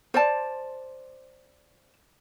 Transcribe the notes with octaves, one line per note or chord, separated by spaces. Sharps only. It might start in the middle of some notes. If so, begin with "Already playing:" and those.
C5 D5 A5